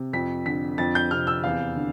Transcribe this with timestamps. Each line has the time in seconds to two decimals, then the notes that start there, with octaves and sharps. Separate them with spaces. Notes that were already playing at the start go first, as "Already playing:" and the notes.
Already playing: C3
0.13 F2 B6
0.46 D3 B6
0.78 F2 A6
0.95 G6
1.11 C3 F6
1.27 E6
1.43 E2 F5
1.76 D3